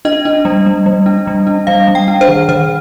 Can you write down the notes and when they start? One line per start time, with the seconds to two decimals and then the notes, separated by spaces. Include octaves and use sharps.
0.05 D4 D#5
0.25 D4
0.45 G3
0.66 G3
0.86 G3
1.06 D4
1.27 G3
1.47 D4
1.67 G3 F5
1.88 G3
1.95 G5
2.08 D4
2.21 C5
2.28 D#3
2.49 D#3 C5